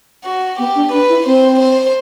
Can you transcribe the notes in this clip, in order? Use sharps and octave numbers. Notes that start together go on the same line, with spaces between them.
F#4
B3 G4
D4
D4 B4
E4
C4 C5
C5